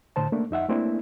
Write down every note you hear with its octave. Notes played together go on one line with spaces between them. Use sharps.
A2 D3 C5 A5
A3 A#3 D4
F2 D#4 E5 F#5
A3 A#3 C4 D4 E4